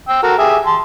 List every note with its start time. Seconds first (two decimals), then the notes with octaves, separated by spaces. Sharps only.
0.08 G5 E6
0.23 F#4 A4 A#4
0.38 G4 G#4 E5
0.66 A5 C6